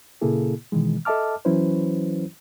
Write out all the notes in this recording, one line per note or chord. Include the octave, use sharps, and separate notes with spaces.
A#2 C#3 A#3 E4 G#4 A4
B2 D#3 E3 G#3
A4 D#5 E5 A5 D6 F6
E3 F#3 C#4 E4 B4 C5